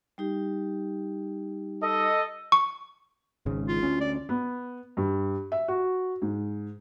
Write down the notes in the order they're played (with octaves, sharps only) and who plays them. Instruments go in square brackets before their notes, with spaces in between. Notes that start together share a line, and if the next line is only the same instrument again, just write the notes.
[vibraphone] G3 D#4 G4
[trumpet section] A4 D#5
[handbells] C#6
[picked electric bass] G#1 G#2 C#3
[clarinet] F4
[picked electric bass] D2 C#4
[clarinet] D5
[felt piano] B3
G2
E5
F#4
G#2